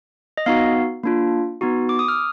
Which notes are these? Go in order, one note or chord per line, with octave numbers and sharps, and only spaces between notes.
D#5
B3 D#4 F#4 F5
A#3 D4 F4
B3 D#4 F#4
D6
D#6
F6